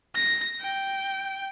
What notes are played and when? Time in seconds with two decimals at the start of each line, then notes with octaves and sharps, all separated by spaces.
0.15 A#6
0.61 G5